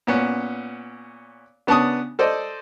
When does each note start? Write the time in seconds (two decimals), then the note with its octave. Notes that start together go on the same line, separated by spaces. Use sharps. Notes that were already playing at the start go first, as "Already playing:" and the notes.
0.07 A#2 B3 C#4
1.67 C#3 B3 D4 A5 C#6 D#6
2.19 A4 C5 D5 D#5